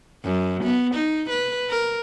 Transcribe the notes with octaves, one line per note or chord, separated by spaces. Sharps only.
F#2
B3
D#4
B4
A#4